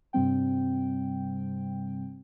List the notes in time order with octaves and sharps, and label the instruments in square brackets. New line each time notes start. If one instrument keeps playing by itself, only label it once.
[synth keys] G2 C3 G3 C4 G5